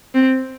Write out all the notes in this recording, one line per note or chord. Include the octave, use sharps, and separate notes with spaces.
C4